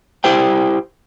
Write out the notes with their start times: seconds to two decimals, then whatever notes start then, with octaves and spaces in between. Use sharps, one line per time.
0.24 E4 G4 C5 G5